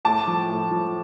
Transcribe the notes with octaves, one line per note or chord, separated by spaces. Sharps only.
A2 A5 D6
F3
A2
F3